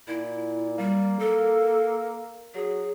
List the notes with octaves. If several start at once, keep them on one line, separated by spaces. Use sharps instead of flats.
A#2 E4
G3 A#3
A4
F#3 G#4